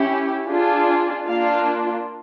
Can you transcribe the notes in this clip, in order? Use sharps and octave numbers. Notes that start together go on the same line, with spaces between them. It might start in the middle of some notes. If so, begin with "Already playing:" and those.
Already playing: C#4 E4 G4
D4 F4 G#4
A#3 D4 F4 F5